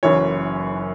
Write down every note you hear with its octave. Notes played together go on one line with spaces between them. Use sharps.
F#1 F#2 E3 C#5